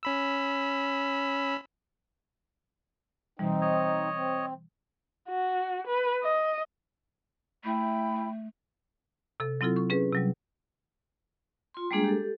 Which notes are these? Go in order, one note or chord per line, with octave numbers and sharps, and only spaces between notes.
C#4 B5 E6
B2 E3 G3 C4 D#4
C#5 D#5
C4
F#4
B4
D#5
A3 E4 G5 B5
C3 A4
F#3 C4 E4 F4 A4
C#6
C#4 G#4 B4
C3 F#3 G3
F4 C6
G3 G#3 A#3 D4 G#4
G4 A4